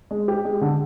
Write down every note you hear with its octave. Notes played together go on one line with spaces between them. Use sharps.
G#3
G4
G#3
D3